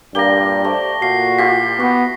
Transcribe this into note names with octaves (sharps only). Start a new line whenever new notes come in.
G2 A#2 A#3 D4 G4 D5 A#6 G7
A3 G4 C5 D5
A#2 F#4 F5 C7
E4 F4 G4 B6
B3 F#4